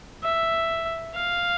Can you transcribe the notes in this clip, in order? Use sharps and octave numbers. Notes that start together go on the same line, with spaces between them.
E5
F5